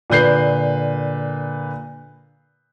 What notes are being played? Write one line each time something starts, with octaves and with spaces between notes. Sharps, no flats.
A#2 D3 B4 G6 C7